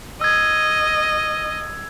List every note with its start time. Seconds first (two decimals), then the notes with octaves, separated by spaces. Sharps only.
0.21 D#5 E6 G#6